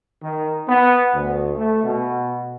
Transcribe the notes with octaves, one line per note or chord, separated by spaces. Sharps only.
D#3
B3
D2
A3
B2